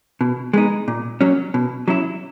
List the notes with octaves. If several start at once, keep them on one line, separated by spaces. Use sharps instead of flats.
B2
G#3 B3 D#4
A#2
F#3 C#4
B2
F#3 C#4 E4